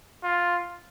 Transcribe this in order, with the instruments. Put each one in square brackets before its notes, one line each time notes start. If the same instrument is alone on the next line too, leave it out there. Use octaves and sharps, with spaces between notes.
[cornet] F4